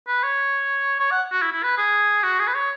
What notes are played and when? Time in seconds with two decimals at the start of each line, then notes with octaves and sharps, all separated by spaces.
0.07 B4
0.23 C#5
1.00 C#5
1.11 F#5
1.31 F#4
1.42 E4
1.52 E4
1.63 B4
1.77 G#4
2.23 F#4
2.39 G#4
2.47 B4
2.54 C#5